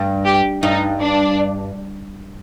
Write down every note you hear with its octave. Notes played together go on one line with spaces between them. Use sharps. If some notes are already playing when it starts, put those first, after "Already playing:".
Already playing: G2
G4
G2 D#4
D4